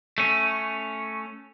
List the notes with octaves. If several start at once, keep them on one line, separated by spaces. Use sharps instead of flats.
A3 C#4